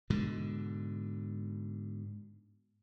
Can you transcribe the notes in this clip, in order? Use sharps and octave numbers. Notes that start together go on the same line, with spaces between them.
G#2 B2 D3